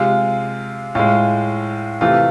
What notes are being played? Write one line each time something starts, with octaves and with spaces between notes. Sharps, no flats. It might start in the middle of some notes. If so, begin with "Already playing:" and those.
Already playing: C3 G#3 F4
A2 G#3 F4
C3 E3 A3 F4